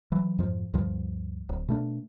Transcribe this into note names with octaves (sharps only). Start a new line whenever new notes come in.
E3 F#3
F2 G#2 F3
D2 G2 F3 G3
D1
B2 A3 D4